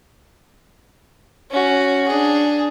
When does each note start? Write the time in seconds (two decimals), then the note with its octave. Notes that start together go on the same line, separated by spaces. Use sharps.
1.51 C#4 F#4
2.08 D4 G#4